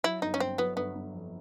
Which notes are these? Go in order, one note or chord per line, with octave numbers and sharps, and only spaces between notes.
F#3 E4
G1 D#4
C#4
G1 C4
F#3 B3
G1 B3
G1
F2